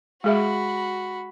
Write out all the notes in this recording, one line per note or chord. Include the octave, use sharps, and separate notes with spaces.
G#3 F#4 G#4 E5 B5